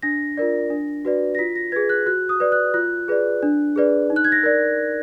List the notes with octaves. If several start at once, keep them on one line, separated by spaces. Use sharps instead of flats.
D4 A#6
F4 A#4 D5
D4
F#4 B4 D5
A#6
F4 B6
A#6
G#4 B4 G#6
F#6
F#4 F#6
D#6
B4 D5
F#6
F4 F#6
G#4 B4 D5
D4
G#4 B4 D5
D#4
F#6
G#6
A#6
A#4 D5